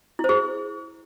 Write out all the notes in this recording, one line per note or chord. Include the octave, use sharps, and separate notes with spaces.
E4 G#4 C5